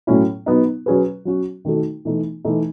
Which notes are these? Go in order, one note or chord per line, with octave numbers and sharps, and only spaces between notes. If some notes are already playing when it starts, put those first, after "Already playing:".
A2 F#3 C#4 E4
F#3 B3 D#4
F#3 C#4 G#4 B4
F#3 C#4 F#4
D#3 A3 D#4 F#4 A4
E3 A3 D#4
E3 A3 D#4 A4